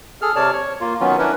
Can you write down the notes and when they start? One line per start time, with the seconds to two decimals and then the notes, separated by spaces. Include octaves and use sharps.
0.22 G#4 A4 F6
0.36 C3 C#5 D5 A5 F6
0.53 C#5
0.81 A#3 F4
1.00 D#3 F#3 B3 C#4 F4
1.18 C#4 D4 E4 A#4 B4